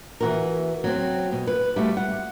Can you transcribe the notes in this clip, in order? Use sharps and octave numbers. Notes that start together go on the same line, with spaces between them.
E3 F#4 A#4
F#3 C4
B2
B4
G3 A3 F4 F#4
F#5